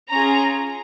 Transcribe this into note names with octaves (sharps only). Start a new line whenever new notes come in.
C#4 F4 G#4 A#5